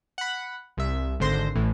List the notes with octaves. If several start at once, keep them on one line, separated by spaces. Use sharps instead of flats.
F#5 B5
C2 E5
G#1 D3 C5 C6 A#6
A1 A2 E3